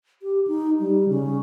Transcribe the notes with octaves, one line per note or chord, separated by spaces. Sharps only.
G4
D#4
G3
C#3